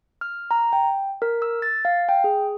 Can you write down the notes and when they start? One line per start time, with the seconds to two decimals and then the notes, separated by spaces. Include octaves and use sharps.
0.21 F6
0.51 A#5
0.73 G5
1.22 A#4
1.42 E6
1.62 A6
1.85 F5
2.09 G5
2.24 G#4